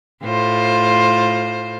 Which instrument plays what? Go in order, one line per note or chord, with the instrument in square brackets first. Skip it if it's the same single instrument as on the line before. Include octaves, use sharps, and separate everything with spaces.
[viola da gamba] A2 F4 C5